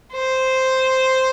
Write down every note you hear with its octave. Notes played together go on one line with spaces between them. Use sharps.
C5